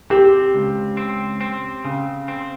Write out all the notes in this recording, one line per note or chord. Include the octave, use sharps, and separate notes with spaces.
C4 G4
C#2
C4
C4
C#3
C4